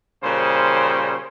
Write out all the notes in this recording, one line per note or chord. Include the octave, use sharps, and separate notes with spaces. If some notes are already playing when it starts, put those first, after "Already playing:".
A#2 C#3 G3 C5